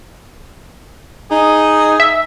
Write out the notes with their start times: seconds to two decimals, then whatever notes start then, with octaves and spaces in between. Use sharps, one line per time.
1.31 D#4 G#4
2.00 E5